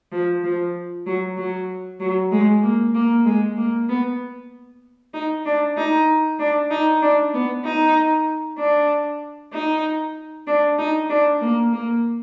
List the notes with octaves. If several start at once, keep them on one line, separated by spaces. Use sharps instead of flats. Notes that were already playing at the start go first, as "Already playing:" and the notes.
F3
F3
F#3
F#3
F#3
G#3
A#3
A#3
G#3
A#3
B3
D#4
D4
D#4
D4
D#4
D4
B3
D#4
D4
D#4
D4
D#4
D4
A#3
A#3